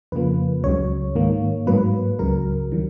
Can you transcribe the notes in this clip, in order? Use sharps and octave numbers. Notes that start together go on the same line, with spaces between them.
F2 C#3 F3 A#3 B4
C#2 C#3 F#3 C#5
G#2 D#3 A#3
G#2 F#3 A#3 B4
C#2 C#3 F#3 A#4
D#3 F#3